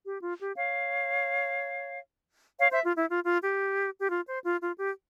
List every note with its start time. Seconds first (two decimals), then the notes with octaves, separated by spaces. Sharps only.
0.06 G4
0.22 F4
0.40 G4
0.56 C#5 F5
2.58 C#5 F5
2.71 C5 E5
2.83 F4
2.97 E4
3.09 F4
3.26 F4
3.43 G4
4.00 G4
4.10 F4
4.27 C5
4.44 F4
4.61 F4
4.78 G4